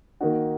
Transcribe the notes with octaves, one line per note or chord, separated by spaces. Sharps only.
D#3 A#3 D#4 F#4